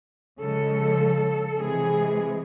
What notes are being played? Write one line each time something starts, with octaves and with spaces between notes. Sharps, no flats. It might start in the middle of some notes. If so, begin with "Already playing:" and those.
C#3 F3 G#3 A4
C3 E3 G#3 G#4